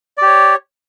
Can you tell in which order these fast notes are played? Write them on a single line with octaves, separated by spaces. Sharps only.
D5 G4 C#5